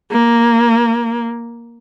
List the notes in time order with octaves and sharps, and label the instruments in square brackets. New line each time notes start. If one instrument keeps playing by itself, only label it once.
[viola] A#3